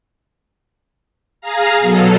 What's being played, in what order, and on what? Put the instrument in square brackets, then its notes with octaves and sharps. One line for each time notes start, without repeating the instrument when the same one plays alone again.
[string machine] G#4 F5 A#5
B2 F#3 A4